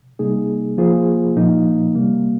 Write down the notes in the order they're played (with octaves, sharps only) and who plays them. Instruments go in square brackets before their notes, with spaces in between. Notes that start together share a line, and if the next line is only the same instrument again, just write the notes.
[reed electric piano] C3 G3 A#3 D#4 G#4
F3 A#3 F4 G#4 C5
A#2 F3 A#3 D#4
C3 G3 A#3